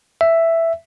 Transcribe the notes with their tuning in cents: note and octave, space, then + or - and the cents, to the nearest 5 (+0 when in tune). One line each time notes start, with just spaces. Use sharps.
E5 +5